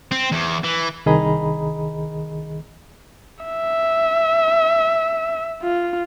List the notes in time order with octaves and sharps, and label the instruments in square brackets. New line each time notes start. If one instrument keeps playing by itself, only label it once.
[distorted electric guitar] C4
E2
E3
[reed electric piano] C2 D#3 G#4 D#5 A#5 B5
[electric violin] E5
F4